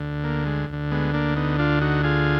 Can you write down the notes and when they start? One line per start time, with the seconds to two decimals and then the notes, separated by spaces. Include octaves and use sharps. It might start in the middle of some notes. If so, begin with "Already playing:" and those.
Already playing: D2 D3
0.24 A#3
0.46 G#3
0.69 D2 D3
0.91 G#3 B3
1.14 A#3 D4
1.36 B3 D#4
1.59 D4 F4
1.81 D#4 F#4
2.04 F4 G#4